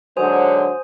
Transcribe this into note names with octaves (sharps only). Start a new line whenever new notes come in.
G#2 D3 F#3 C5 G#5 D#6